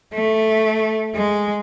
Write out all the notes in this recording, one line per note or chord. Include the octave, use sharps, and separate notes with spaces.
A3
G#3